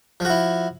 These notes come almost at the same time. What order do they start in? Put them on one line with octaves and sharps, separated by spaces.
F3 F#4 E4